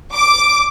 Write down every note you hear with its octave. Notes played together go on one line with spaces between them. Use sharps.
D6